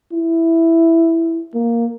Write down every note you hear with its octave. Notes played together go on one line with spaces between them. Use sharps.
E4
A#3